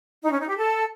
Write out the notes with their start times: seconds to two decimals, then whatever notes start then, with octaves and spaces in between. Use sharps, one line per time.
0.23 D#4
0.32 C#4
0.40 D#4
0.49 G4
0.57 A4